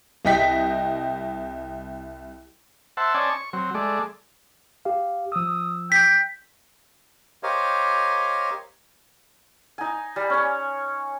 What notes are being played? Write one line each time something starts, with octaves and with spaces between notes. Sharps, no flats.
C2 D#5 G5 B6
C5 E5 F#5 A5
C#4 C5 D5 D#5 G#5 A5
C#6
F#3 C4
G#3 A3 D5
G4 F5
F3 D#6 E6
G5 B6
G4 A#4 C5 C#5 D#5 F5
D#4 G#5
G3
C#4 C#5